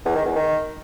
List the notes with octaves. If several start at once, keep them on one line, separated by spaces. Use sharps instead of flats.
E2
D#3
E2
D#3